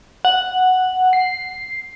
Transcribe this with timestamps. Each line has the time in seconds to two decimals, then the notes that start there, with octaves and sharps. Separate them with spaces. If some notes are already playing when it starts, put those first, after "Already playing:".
0.25 F#5
1.13 C7